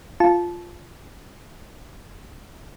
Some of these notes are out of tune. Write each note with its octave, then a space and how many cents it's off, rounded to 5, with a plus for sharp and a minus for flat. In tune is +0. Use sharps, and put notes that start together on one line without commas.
F4 +0 A5 -20